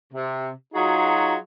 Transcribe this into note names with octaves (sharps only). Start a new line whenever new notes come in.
C3
F#3 D#4 F4 F#4 G#4